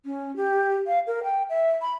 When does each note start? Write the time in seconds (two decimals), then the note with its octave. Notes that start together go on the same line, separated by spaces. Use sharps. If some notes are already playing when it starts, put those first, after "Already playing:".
0.05 C#4
0.36 G4
0.87 F5
1.07 A#4
1.24 G5
1.50 E5
1.82 B5